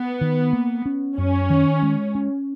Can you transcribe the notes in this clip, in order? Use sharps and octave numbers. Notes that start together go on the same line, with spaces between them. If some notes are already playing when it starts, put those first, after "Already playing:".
Already playing: B3
D#3
A#3
C#4
F#2 C#4
D#3
G#3
C#4